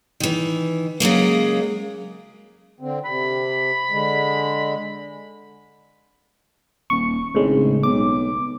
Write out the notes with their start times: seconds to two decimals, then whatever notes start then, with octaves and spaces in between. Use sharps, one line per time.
0.20 D#3 E3
1.00 C#3 F#3 G#3 A#3
2.80 D3 C4
3.05 C3 B5
3.90 D3 G#3
6.90 D#1 C#6
7.35 G#1 A2 C#3 G#3
7.83 B1 D6